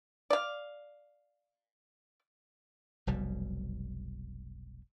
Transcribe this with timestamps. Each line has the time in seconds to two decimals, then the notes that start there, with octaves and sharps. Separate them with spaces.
0.30 D5 F5
3.07 F1 B1 B2 G3